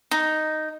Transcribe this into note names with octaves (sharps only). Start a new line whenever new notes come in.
D#4